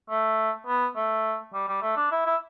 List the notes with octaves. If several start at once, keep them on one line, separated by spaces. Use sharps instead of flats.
A3
B3
A3
G3
G3
A3
D4
E4
E4